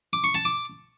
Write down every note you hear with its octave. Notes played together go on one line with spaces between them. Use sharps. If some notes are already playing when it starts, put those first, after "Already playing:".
D6
C#6
A5
D6